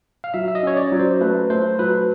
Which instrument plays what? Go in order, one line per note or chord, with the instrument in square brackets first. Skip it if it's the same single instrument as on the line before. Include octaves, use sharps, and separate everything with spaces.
[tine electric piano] F5
[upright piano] F#3 [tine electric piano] E5
[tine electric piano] E5
D#5
[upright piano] C#4 [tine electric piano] C#5
[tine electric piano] D5
[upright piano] F#3
[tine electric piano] C5
[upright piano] A3 [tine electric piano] B4
[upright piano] A3 [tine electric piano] C5
[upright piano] F#3 [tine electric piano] B4